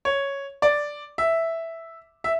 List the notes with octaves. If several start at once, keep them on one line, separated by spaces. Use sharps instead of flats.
C#5
D5
E5
E5